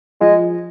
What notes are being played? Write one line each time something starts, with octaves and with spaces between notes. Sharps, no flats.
F3 G#3